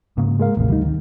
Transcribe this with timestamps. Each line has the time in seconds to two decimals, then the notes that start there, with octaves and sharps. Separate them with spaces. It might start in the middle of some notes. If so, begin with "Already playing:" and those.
0.17 G#2 C#3 A#3
0.40 G#3 A#4 F5
0.57 A1 D#2 A2 C3
0.69 D2 G3 D#4
0.83 D#3